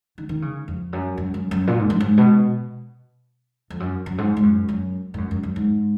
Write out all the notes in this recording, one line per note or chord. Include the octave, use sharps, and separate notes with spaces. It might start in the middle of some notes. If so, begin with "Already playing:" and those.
D#3
D#3
C#3
F2
F#2
F#2
F#2
F#2
A#2
G#2
F#2
G#2
B2
F2
F#2
F#2
G#2
G#2
F#2
F#2
G#2
F#2
F#2
F#2
G#2